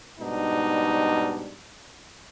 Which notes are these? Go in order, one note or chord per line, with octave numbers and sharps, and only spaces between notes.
G#2 B2 G3 D4 D#4